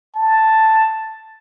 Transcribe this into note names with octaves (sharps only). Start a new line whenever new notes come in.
A5